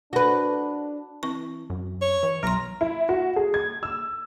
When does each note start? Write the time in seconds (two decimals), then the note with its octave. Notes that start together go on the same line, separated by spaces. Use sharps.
0.13 D4 F#4 B4
1.23 E3 C4 C#6
1.70 F#2
2.02 C#5
2.23 E3
2.43 B1 F#3 A#5 C6
2.81 E4
3.09 F#4
3.36 G#4
3.54 G#6
3.83 E6